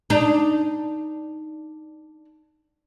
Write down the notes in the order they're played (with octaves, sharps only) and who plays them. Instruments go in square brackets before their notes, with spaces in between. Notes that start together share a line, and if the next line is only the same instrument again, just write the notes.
[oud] D4 D#4